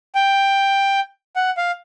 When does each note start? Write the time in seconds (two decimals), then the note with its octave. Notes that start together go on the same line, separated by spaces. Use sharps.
0.15 G5
1.36 F#5
1.57 F5